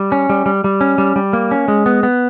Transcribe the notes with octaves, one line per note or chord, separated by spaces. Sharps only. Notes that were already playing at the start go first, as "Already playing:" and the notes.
Already playing: G3
C#4
G3
G3
G3
C#4
G3
G3
A#3
C#4
G#3
B3
B3